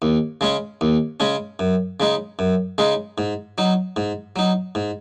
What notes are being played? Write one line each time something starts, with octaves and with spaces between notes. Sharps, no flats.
D#2
C#3 G#3 C#4
D#2
C#3 G#3 C#4
F#2
C#3 G#3 D#4
F#2
C#3 G#3 D#4
G#2
F#3 D#4
G#2
F#3 D#4
G#2